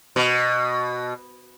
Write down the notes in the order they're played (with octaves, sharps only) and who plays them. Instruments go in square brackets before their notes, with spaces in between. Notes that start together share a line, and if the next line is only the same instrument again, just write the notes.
[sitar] B2